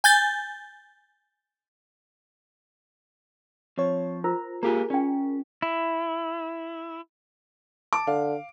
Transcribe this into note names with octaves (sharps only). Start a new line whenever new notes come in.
G#5 G6 A6
F3 C4 C#5
F4 A#4 C5 A#5
A#3 F4 G4 G#4 A#4 G#5 A#5
C#4 D5 G5
E4
A5 D6
D3 F5